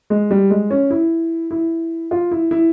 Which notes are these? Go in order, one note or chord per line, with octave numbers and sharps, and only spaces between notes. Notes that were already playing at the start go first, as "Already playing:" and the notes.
G#3
G3
G#3
C#4
E4
E4
F4
E4
E4